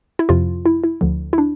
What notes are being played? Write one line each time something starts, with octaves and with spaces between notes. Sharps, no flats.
E4
F2 C3 F3 F4
E4
E4
D2 D3 F3
E4
D4